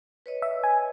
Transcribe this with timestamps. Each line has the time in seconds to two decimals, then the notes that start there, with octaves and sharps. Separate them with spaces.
0.26 B4 C#5 D#5
0.42 E5
0.64 G#5